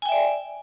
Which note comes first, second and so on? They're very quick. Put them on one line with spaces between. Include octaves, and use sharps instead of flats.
G#5 G5 E5 D5